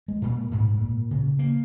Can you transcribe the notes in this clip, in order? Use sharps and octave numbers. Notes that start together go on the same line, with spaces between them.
G#3
A#2
G#2
A#2
C#3
A#3